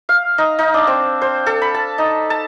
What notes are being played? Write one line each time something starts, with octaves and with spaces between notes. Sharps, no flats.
F5
D#4
D#4
D4
C4
C5
A4
B5
A5
D#4
A5